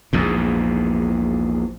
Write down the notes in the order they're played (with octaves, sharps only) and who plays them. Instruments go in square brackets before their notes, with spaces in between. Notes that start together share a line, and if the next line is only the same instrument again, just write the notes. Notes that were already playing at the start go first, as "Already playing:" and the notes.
[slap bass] A#1 E2 G#2